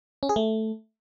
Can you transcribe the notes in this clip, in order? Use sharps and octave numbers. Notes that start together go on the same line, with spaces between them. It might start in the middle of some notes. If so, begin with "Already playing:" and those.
C#4
G#4
A3